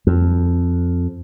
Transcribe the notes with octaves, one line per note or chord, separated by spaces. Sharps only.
F2